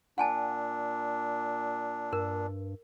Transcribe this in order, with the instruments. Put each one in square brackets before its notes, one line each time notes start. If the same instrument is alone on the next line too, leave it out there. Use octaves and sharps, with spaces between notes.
[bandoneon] A#2 D4 [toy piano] F#5 G#5 A5
[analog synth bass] G2 [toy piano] A#4